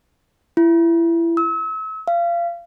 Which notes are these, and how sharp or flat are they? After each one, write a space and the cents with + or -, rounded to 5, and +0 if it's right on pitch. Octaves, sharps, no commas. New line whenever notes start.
E4 +25
E6 -35
F5 -30